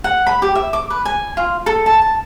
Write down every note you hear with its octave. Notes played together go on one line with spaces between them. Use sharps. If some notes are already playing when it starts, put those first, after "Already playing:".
F#5
B5
G4
E5
D6
B4
G#5
F4
A4
A5
A5